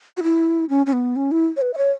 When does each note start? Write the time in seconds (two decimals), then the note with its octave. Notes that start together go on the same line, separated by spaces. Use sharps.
0.17 F#4
0.23 E4
0.70 C#4
0.86 C#4
0.93 B3
1.16 C#4
1.32 E4
1.57 C#5
1.62 B4
1.74 E5
1.78 C#5